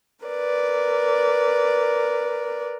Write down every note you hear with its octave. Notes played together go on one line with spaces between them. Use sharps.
A#4 B4 D5